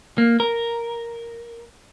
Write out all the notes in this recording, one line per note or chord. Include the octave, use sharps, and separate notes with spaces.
A#3
A#4